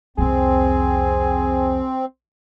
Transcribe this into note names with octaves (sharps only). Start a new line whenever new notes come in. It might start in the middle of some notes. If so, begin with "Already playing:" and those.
C2 F2 C4 G#4